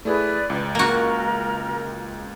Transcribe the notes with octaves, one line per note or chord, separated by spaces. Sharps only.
A3 E4 G#4 B4 D5
C#2
A#3 F#4 A#4